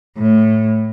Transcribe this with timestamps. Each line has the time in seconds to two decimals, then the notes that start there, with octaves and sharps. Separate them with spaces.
0.18 A2